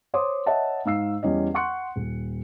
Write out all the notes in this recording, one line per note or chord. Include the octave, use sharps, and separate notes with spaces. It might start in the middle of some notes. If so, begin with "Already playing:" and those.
C5 C#5 C6 D6 D#6
C#5 D#5 E5 F#5 A5
G#2 F5 E6 C7
E2 G3 C#4 D#5
F#5 C6 C#6 F#6 C#7
D#1